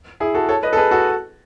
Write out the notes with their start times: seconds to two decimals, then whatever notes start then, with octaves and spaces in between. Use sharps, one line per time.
0.20 E4 G#4
0.34 F#4 A4
0.49 A4 C#5
0.63 B4 D#5
0.73 A4
0.77 G#4 B4
0.91 F#4 A4